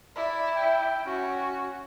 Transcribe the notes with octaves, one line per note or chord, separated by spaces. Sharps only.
E4 D5
G5
C#4 F#4